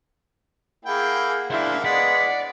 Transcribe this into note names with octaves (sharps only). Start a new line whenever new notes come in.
A#3 E4 G#4 F#5 G5
A#3 D4 E4 C5
G#3 B3 D5 F#5 B6